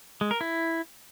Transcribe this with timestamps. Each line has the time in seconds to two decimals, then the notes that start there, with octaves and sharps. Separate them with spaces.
0.21 G#3
0.31 A#4
0.41 E4